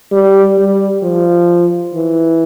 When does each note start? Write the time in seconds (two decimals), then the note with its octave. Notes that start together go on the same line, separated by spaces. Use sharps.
0.12 G3
0.58 G3
1.03 F3
1.94 E3